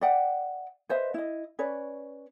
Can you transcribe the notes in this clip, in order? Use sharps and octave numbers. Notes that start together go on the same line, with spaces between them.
D5 E5 F#5 G5
B4 C5 D#5 E5
E4 D#5
C#4 B4 C#5 D5